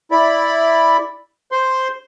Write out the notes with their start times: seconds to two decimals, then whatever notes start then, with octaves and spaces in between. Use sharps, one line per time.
0.11 E4 D5 B5
1.52 C5 C6